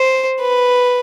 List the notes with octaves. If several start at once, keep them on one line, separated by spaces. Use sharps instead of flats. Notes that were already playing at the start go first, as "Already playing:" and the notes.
Already playing: C5
B4